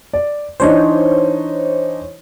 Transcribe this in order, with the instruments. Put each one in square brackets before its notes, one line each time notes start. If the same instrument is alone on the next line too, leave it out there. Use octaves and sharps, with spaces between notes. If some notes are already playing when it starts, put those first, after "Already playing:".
[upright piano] D5
[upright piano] E3 D4 D#4 [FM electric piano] C5 C#5